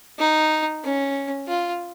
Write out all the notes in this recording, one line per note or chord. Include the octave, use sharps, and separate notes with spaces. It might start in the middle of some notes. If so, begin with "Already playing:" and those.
D#4
C#4
F4